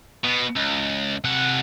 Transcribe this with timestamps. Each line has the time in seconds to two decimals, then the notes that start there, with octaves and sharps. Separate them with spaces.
0.24 B2
0.56 C#2
1.24 C3 F#5